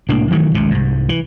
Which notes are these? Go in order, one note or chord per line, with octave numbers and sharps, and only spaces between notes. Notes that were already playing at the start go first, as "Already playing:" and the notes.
C2 A2 A#3 D4
D#3 E3 F#3 A3
G#1 C#2 C3
C2 G#2
E3